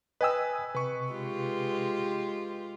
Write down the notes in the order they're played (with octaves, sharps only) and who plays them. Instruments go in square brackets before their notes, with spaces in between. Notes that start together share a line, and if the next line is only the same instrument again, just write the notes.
[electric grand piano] B4 G#5 D#6 [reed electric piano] D#5 G5 E6
[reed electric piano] C3 [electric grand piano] B4 C#6
[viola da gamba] G#3 F4 G4